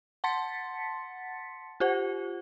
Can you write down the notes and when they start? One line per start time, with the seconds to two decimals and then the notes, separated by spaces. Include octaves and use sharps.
0.24 F#5 A5 C6 A6 B6 C#7
1.80 F4 G4 C5 F#5